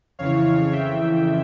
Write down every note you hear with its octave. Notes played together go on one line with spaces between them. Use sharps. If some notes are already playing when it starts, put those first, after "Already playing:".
F2 C#3 E3 C#5 F5
F2 C#3 E3 E5 G5